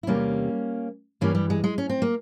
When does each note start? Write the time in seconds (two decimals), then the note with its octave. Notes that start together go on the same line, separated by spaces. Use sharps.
0.03 E4
0.07 E2 C3 G3 A#3 C#4
1.21 G2 E3 G3 A#3 C#4
1.35 G3
1.50 G#3
1.64 G#3
1.78 C#4
1.89 C4
2.02 A#3